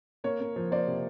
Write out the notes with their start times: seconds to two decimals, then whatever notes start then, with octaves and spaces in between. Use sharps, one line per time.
0.24 A#3 C#5
0.40 A#3
0.56 F3
0.72 A#3 C5 D5
0.87 C3